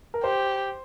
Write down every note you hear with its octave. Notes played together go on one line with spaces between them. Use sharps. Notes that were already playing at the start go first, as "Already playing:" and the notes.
A#4
G4 C5